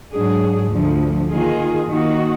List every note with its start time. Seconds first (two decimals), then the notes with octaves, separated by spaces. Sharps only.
0.12 G#2 F#3 D4 G#4
0.70 D2 D3 F3
1.29 D#3 A#3 F4 G#4
1.88 D#3 A#3 D#4 F#4